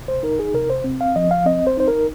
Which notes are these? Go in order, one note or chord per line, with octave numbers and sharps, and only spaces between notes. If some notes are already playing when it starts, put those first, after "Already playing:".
Already playing: C3
C5
D#4 A#4
G#4
C3 A#4
C5
C4
F5
F3 D#5
F5
C4 D#5
C5
D#4 C5
A#4